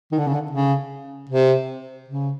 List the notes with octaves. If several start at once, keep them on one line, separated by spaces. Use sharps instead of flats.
D#3
D3
C#3
D3
C#3
C3
C#3